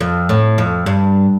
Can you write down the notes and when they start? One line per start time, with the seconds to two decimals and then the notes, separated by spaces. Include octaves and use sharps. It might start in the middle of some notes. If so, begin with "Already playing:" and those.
0.01 F2
0.29 A2
0.58 F2
0.86 G2